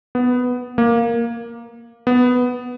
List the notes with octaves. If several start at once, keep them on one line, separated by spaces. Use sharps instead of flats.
B3
A#3
B3